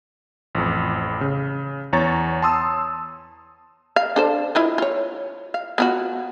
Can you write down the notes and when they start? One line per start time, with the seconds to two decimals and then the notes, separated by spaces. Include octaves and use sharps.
0.55 A1 F2
1.21 C#3
1.93 E2 C#5 A#5 C#6 A6
2.42 A5 C6 D#6 E6
3.96 F5
4.16 D4 A4 C5
4.55 E4 F4 D#5
4.78 F4 C#5
5.54 F5
5.78 B3 F4 F#4